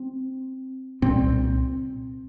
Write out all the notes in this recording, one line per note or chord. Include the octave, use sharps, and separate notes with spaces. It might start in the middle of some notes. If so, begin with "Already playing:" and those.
Already playing: C4
C2 A#2 C4